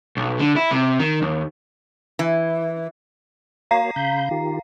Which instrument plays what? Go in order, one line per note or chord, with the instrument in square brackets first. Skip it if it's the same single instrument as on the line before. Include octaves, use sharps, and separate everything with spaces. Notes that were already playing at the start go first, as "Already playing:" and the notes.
[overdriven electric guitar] B1
D3
E4
C3
D#3
D#2
[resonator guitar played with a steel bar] E3
[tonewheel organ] A#3 F#4 C#5 [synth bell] F5 A#5 C7
[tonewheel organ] C#3 B5 G6
D#3 F4 G4